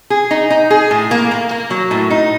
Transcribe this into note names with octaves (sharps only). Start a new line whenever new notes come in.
G#4
D#4
D#4
G#4
A2
A#3
A#3
A#3
F#3
A2
D#4